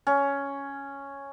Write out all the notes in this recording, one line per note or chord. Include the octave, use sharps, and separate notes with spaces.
C#4